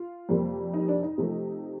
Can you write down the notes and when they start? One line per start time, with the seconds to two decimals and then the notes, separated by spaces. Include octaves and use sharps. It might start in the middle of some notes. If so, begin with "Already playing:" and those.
Already playing: F4
0.29 F2 C3 G3 A#3
0.74 D#4
0.88 D4
1.03 D#4
1.18 C3 F3 A3